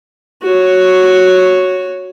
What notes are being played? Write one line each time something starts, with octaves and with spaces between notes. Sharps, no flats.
F#4 C#5